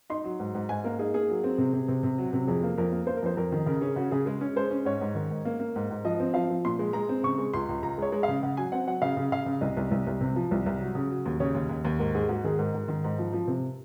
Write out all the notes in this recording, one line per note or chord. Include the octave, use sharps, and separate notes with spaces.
D#4 C6
F#3
G#2
G#2
G#2 G#5
A#3 A#4
D#4 G#4
A#3 G#4
F#3
C4
C3
C3
C3
C3
F#3
C3
F2 G#4
A#3
F2 A#4
A#3
A#3 C5
A#4
F2 C5
F2 A#4
D#3
C#3 A#4
C#4 G#4
C#3 F#4
C#3 G#4
G#3 G#4
C#4
G#3 C5
C#4
G#2 C#5
G#2
D#3
G#2
A#3
A#3
G#2
G#2
F3 D#5
C4
F3 F5
F3
A#2 C6
G#3
G#3 A#5
C4
C#3 C#6
G#3
C#2 C6
C#2
C#2 A#5
G#3 C#5
G#3
F5
C#3
C#3 F#5
F#3 G#5
C4 F#5
F#3 F#5
C#3 F5
C#3
C#3 F5
C#3
C2 D#5
C2
C2
C2
C3
F3
C2
C2
F#3
C#3
F#3
D#2
C#3 C#5
D#2
D#2
D#2
G#2 A#4
G#2 G#4
G#2 F#4
D#3 G#4
G#2 A#4
G#2
D#3
G#2
F3
F3
C3